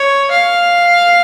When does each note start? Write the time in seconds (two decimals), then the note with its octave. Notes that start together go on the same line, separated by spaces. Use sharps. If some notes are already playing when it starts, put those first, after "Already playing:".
Already playing: C#5
0.31 F5